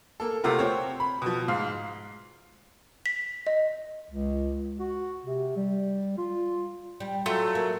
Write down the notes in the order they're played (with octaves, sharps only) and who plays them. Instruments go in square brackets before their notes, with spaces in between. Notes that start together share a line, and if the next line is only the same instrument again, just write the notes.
[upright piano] A#3 A4
C3 A3 F4 F#4 A#4
C4 C#5
B5
B2 F3
G#2 F5
[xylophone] B6
D#5
[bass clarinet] C#2
F#4
C3
G3
F4
[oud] G3
[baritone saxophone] F#3 [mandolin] A3 [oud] F4
[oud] A#3